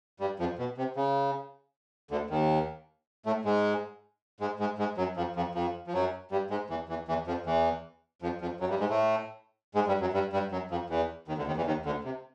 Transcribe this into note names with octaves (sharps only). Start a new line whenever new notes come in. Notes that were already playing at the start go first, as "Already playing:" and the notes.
G2 G3
F2 F3
B2
C3
C#3
D2 D3
D#2 D#3
A2 A3
G#2 G#3
G#2 G#3
G#2 G#3
G#2 G#3
F#2 F#3
F2 F3
F2 F3
F2 F3
F3
F#2 F#3
G2 G3
G#2 G#3
E2 E3
E2 E3
E2 E3
F2 F3
E2 E3
F2 F3
F2 F3
F#2 F#3
G2 G3
G#2 G#3
A2 A3
G#2 G#3
G2 G3
F#2 F#3
G2 G3
G2 G3
F#2 F#3
F2 F3
E2 E3
D#2 D#3
D2 D3
D#2 D#3
E2 E3
D#2 D#3
D2 D3
C3